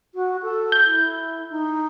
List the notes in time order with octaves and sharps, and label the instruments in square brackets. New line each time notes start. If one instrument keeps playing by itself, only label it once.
[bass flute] F#4
A4
[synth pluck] G6
[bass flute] E4
D#4